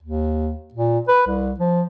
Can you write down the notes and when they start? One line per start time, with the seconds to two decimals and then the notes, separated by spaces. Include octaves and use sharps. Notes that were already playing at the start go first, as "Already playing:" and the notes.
0.03 D#2
0.74 A#2
1.08 B4
1.27 C2
1.59 F3